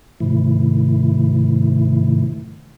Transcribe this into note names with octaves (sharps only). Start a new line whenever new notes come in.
G#2 C3 D#3 F3 A3 E4